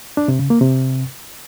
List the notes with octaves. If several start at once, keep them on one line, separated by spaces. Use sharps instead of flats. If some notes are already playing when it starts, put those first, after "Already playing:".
D4
C3
C#3
A#3
C3